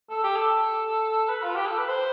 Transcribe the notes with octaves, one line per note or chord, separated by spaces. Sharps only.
A4
G4
A4
B4
F4
G4
A4
B4
C5